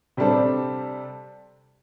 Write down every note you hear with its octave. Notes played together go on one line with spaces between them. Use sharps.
C3 G3 D4 A4 C5